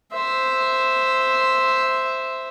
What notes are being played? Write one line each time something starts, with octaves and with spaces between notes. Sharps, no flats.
C5 E5